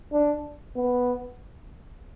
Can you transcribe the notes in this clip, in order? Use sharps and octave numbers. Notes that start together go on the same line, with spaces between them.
D4
B3